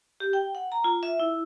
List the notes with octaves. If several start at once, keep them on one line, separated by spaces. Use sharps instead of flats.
G4
G5
F#5
A#5
F4
E5
E4